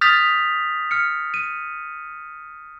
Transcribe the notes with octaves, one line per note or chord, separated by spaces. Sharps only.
D#6 F6 G6 A6 B6 F7
F6 C#7
D#7